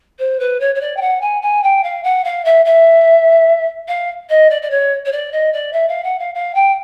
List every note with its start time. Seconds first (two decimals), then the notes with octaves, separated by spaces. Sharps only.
0.19 C5
0.40 B4
0.60 C#5
0.75 C#5
0.80 D5
0.97 G5
1.01 F#5
1.21 G#5
1.42 G#5
1.63 G5
1.83 F5
2.03 F#5
2.24 F5
2.45 E5
2.65 E5
3.88 F5
4.29 D#5
4.50 D5
4.62 D5
4.70 C#5
5.05 C#5
5.12 D5
5.32 D#5
5.53 D5
5.73 E5
5.88 F5
6.04 F#5
6.19 F5
6.35 F5
6.55 G5